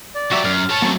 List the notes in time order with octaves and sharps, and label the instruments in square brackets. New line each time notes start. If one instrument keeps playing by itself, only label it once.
[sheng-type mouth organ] D5
[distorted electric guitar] F#3 G4 [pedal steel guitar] F#4 E5
[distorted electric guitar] F#2 [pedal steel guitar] F6
[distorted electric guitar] A4 C#5 [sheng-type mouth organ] A5 C#6
[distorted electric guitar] F#3 A3 [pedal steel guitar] A#3 C4 C#4